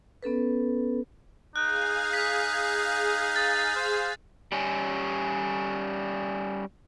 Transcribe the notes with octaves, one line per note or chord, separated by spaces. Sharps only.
B3 C#4 A4 B4
D#4 G#4 F5 F#6
B6
A6
C5
G3 C#4